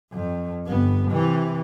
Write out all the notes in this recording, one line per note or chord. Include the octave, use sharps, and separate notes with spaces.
F2
G1 B3
C3 E3